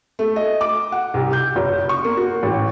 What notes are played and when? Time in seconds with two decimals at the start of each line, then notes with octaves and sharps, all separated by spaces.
0.19 A3
0.36 D#5
0.61 D6
0.92 F#5
1.14 C2
1.33 G6
1.56 F#1
1.89 C#6
2.04 A#3
2.17 F#4
2.43 A1